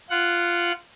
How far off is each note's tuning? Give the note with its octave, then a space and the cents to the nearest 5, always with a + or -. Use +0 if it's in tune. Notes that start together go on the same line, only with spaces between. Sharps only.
F4 -10 F#5 +0